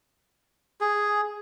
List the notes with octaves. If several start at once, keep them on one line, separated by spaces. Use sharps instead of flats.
G#4